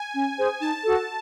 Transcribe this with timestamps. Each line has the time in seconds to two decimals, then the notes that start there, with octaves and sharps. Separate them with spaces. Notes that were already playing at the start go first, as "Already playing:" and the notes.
Already playing: G#5
0.14 C#4
0.38 G#4 C5
0.61 D#4 A5
0.84 F#4 A4